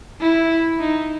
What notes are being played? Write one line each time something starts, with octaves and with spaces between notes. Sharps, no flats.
E4
D#4